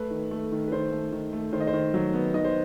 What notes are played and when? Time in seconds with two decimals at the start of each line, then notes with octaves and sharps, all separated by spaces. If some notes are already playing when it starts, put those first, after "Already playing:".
Already playing: A3 B4
0.11 D#3
0.31 A3
0.52 D#3
0.68 B4
0.72 D#3 C5
0.92 A3
1.12 D#3
1.33 A3
1.53 D#3 C5
1.61 D#5
1.67 C5
1.73 D#3
1.94 F#3
2.14 B3
2.34 D#3 D#5
2.44 C5